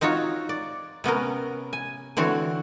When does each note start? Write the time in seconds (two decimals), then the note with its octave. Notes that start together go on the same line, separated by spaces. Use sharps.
0.01 C4 D#4 F4 F#4 C#5
0.49 D5
1.04 C3 B3 C#4 A#4
1.73 G#5
2.17 D3 E3 C4 F#4 C#5